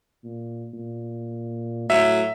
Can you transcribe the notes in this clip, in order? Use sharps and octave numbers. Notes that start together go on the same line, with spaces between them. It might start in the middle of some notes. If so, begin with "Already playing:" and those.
A#2
A#2
A2 F#3 E5